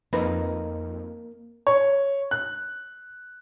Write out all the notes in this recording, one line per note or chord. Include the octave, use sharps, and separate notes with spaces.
F2 A#3 D#4 A#4 B4 B5
C#5
F#6